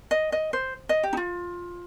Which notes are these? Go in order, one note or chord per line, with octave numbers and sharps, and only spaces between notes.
D#5
D#5
C5
D#5
G4
D#4
F4